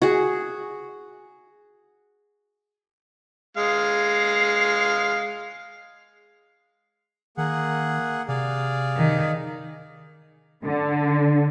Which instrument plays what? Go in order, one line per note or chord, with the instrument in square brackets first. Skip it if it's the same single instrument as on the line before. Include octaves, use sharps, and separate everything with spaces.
[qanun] F#4 G#4
[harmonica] G#3 F5
[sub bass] D#3 [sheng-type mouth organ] A#3 G#4 F#5
[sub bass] C3 [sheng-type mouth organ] G#4 D5 F5
[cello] D#3
[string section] D3